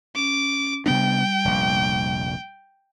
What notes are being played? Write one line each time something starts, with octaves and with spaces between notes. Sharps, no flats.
C#4 D6
C3 G3 B3 D4 G5
F1 A#1